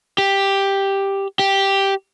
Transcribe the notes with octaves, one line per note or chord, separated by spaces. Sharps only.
G4
G4